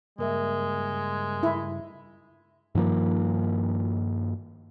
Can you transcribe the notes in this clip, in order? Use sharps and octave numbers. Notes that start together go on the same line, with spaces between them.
G2 C#3 G3 G#3 A#3 A#4 E5
E4
G2 D#3 F3 A#3